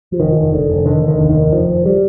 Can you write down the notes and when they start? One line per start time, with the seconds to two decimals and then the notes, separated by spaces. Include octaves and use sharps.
0.12 F3
0.20 F1 D#3
0.37 F1
0.52 F1 D3
0.70 F1
0.86 D3 D#3
1.03 F1
1.08 D#3
1.19 D#2
1.30 D#3
1.35 F1
1.52 F1 F3
1.68 F1
1.86 G3